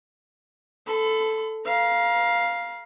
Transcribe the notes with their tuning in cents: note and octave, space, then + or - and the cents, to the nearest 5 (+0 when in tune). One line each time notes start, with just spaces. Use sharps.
A4 +0 B5 +40
F5 +0 A#5 +35